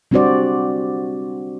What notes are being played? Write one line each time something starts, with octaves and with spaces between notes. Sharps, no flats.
G3 C4 D4 F#4 C5 D5